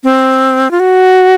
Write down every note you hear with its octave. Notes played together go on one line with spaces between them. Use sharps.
C4
F4
F#4